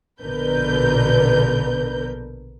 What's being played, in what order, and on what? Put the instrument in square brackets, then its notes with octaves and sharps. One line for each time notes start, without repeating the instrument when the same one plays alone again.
[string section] A#1 B2 D3 A#4 B4 G6